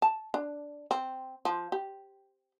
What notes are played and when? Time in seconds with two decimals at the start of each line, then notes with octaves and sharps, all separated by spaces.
0.02 A5
0.34 D4
0.91 C4
1.45 F3
1.72 G4